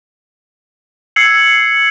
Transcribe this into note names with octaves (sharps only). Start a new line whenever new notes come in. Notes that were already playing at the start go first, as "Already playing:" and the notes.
E6 G#6 C7 C#7 F#7